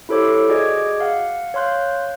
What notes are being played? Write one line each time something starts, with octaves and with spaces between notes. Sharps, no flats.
E4 G4 A4 C5 C#5 D6
F#4 G#4 D5 D#5 D6 G#6
F5 F#5
C#5 F5 C6 F#6 G6